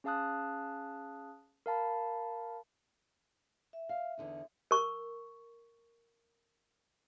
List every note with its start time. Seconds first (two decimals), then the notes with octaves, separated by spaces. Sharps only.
0.04 C#4 G#4 F5 A5 D#6 F#6
1.66 A#4 F5 A5 B5
3.73 E5
3.89 F5
4.17 E2 D3 D#4
4.71 A#4 C#6